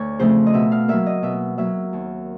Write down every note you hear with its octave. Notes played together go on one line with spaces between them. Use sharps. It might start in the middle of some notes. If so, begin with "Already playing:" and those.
Already playing: D2 C#5
C#3 F3 A3 C4 C5
D#5
B2 E5
F5
F#3 A#3 E5
D#5
B2 E5
F#3 A#3 E5
D#2